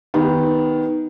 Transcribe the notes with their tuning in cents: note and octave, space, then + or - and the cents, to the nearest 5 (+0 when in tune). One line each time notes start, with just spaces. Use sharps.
D#3 +10 B3 +0 G4 +0